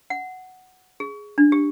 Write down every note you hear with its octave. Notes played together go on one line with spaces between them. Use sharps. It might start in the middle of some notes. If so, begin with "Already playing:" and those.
F#5
G#4
D4
G4